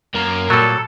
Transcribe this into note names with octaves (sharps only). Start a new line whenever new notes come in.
F#2 A#3 A#5
A#2 F#3 G3 A4